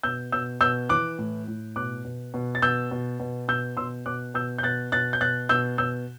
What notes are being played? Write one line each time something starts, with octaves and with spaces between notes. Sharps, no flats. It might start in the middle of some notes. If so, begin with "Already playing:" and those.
B2 E6 G6
B2 E6 G6
B2 E6 G6
E3 D6 F#6
A2
A2
B2 D6 F#6
B2
B2
A6
B2 E6 G6
B2
B2
B2 E6 G6
B2 C6 E6
B2 D6 F#6
B2 E6 G6
G6
B2 F#6 A6
B2 F#6 A6
G6
B2 F#6 A6
B2 E6 G6
B2 E6 G6